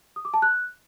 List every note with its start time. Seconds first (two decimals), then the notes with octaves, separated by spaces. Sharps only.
0.16 D#6
0.25 D6
0.34 A5
0.42 F#6